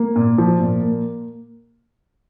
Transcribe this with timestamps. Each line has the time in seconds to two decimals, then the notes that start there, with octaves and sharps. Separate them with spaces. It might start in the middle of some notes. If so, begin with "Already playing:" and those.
Already playing: A#3
0.16 A#2
0.38 F3
0.60 A#2
0.82 A#3